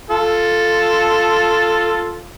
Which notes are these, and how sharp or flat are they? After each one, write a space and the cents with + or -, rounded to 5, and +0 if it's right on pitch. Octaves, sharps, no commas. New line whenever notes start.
F4 -5 A4 +0